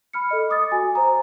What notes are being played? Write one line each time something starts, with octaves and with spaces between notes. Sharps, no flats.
B5 F6 C#7
A4 D#5
D6 D#6 A6
F#4 G#5
C5 A#5